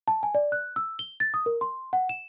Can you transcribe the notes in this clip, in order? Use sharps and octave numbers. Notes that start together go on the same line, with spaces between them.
A5
G#5
D5
F#6
E6
G7
A6
D#6
A#4
C6
F#5
E7